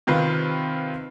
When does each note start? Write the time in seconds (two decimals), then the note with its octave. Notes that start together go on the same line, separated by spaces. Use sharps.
0.07 C3 D#3 F4 B4